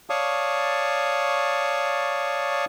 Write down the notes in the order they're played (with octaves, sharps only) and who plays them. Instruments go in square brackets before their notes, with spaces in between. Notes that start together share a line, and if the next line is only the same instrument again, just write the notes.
[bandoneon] C#5 D5 F5 A5 C#6 D#6